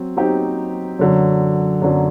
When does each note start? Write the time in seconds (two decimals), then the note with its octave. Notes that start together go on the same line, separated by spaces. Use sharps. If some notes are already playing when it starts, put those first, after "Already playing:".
Already playing: F#3 C4
0.17 F#3 C4 D#4 G4
0.99 F#2 D3 F#3
1.82 F#2 D3 F#3